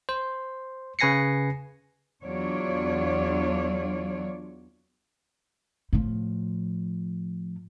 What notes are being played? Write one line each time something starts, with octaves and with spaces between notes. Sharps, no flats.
C5
C#3 B4 G#5 A#6 C7 C#7
E2 F#3 D4 F4 C#5 D5
A2 F3